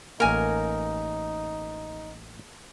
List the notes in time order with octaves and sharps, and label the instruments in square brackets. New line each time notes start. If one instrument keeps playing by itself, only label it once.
[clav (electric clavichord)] A1 A#3 [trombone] D#4 [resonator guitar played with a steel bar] A#4 G#5